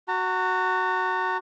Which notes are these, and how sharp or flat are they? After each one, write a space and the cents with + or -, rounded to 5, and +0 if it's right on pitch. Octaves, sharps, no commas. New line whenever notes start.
F#4 +5 A#5 -40